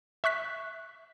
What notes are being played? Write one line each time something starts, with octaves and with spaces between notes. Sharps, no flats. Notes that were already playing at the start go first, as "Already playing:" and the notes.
E5 C#6 F#6 B6